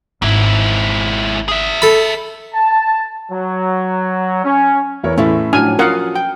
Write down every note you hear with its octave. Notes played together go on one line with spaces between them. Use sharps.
G#1 G#2 E4
G#4 E5
A4 B5
A5
F#3
C#4
E2 E4 A#4 C#5
A2 C#4 E4 A4 E5
A2 F3 F#3 D4 G#5 F6
C#4 F4 A#4 F5 F#5 D#6
G5